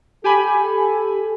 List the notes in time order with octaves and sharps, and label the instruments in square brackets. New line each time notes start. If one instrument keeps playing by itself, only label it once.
[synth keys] G4 G#5 B5 [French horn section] A4